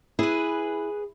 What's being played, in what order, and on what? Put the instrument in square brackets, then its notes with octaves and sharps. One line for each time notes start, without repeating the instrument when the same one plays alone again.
[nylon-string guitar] E4 [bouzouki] G#4 B4